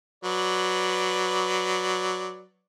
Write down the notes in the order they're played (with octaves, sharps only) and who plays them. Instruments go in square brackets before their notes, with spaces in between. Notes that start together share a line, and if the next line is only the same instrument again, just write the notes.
[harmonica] F#3 B4 D5